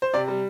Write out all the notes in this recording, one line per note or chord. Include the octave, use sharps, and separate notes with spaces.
C5
C3 D5
G3